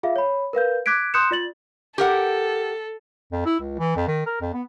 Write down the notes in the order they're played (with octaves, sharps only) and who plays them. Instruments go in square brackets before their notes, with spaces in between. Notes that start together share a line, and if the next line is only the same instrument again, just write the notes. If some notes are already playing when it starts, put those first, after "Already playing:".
[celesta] F4 G#4 E5 F5
C#5 B5
A#4 B4 F5 G6
D6 F#6 G#6 B6 D7
C6 D#6 F#6 G6 C#7 E7
F4 D5 A6 F#7
[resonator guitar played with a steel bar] G4 A#4 F#5 [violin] A4
[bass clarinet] F2
E4
C#2
E3
F2
D#3
A#4
F2
B3